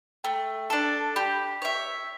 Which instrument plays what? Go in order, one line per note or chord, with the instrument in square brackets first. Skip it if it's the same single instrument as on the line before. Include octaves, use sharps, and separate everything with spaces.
[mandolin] A3 [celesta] G5
[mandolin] D4 A4 [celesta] A5
[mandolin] G4 [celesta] B5
[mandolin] C#5 E5